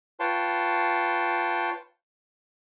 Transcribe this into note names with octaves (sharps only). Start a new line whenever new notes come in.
F4 B4 C#5 G5 A5 C6